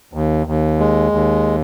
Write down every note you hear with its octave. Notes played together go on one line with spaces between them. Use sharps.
D#2
D#2
G#3
D#2